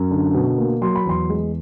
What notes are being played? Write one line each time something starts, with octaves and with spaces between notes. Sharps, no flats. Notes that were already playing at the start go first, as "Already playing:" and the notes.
Already playing: F#2
D3
B2
A#3
F#3 C6
B5
E2 C6
G#3